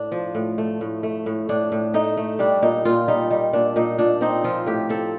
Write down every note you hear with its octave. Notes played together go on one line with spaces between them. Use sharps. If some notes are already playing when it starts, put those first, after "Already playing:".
Already playing: A2 D4
F3
A2
A3
A2
A3
A2
A2 D4
A2
A3 D#4
A3
G3 D4
A#2 D#4
A#2 F4
G3 D#4
G3 D#4
A#2 D4
A#2 D#4
A#2 D4
C4 D#4
F3 F4
A2 G4
C4 A4